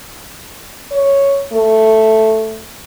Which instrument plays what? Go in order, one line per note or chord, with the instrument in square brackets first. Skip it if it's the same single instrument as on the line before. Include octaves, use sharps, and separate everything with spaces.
[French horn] C#5
A3